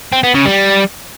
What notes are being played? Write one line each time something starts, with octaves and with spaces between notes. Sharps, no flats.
C4
B3
C#3
G3